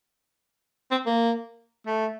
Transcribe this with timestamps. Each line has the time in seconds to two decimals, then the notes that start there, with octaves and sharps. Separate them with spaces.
0.91 C4
1.07 A#3
1.87 A3